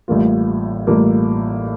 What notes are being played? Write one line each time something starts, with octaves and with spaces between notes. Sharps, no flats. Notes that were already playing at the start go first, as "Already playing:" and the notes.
A1 A2 G3 A#3 F4
A1 A2 G3 A#3 F4